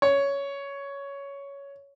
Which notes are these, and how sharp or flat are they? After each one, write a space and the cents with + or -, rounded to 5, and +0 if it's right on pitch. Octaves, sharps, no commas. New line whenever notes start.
C#5 +10